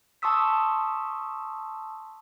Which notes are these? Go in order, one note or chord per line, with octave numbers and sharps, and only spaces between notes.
A5 C6 C#6 D#6 E6 B6